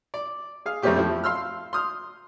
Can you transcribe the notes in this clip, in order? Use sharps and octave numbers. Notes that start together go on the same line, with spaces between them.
D5
G#4 F5
F2 A3 C4 C#4 G4 D6
F3 A3 E4
F5 C6 E6 F6
C6 D#6 F6